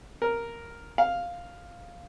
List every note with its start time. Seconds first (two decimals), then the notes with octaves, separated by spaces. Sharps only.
0.22 A#4
0.98 F5